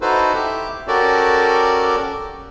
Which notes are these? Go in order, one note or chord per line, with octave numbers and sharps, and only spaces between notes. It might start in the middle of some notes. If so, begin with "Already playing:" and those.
D#4 E4 F#4 A4 B4 C5
G4 E5
C#4 F#4 G4 A4 A#4 D5